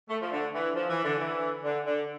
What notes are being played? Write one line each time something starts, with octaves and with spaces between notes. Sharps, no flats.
A3
F3
D3
E3
F3
E3
D3
E3
D3
D3